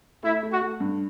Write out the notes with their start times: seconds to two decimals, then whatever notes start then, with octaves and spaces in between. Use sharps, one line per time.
0.23 A3 E4
0.43 A3
0.51 F#4
0.61 A3
0.80 G2